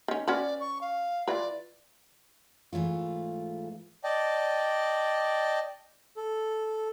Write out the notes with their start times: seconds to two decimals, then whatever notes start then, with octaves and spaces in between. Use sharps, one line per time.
0.08 D#3 C#4
0.28 C#4 F#4 B4 D5
0.60 C#6
0.81 F5
1.28 E3 F4 B4 D5
2.73 G#2 E3 A3 F4
4.04 D5 D#5 G5 A5
6.17 A4